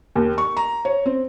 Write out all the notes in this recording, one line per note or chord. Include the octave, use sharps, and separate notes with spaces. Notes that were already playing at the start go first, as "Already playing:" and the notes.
D#2
C#6
A#5
C#5
C4